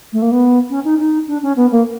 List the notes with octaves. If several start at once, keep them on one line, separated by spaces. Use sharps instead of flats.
A3
A#3
B3
C#4
D#4
D#4
D4
C#4
B3
A#3